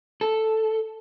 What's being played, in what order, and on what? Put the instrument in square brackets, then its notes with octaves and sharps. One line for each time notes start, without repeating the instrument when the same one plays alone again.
[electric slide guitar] A4